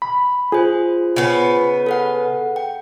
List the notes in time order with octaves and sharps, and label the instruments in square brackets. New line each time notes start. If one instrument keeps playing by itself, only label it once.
[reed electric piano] B5
[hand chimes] F4 C5 [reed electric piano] G#4
[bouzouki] C#3 B3
[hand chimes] A4 B4 F#5
G5